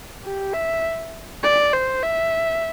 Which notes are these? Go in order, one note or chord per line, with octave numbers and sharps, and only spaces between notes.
G4
E5
D5
C5
E5